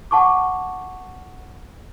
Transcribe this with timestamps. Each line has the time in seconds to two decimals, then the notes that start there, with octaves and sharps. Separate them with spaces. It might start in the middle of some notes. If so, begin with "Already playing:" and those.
0.11 F#5 A5 C#6 D6